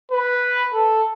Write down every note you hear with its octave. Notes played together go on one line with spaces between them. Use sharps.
B4
A4